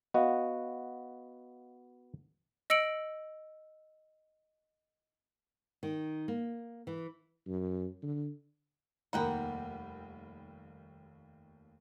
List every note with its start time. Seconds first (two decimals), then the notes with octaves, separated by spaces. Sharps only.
0.14 B3 F#4 D#5 F5
2.70 D#5 E6 C#7 D7 F#7
5.83 D#3
6.28 A#3
6.87 E3
7.47 F#2
8.03 D3
9.13 F1 D#2 G3 A#3 D#4 F#5 G5 B5